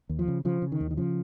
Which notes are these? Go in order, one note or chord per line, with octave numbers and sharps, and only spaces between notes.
D#2
F3
C#3
C#3 F3
C#3
D#3
D#2
D#3
C#3 F3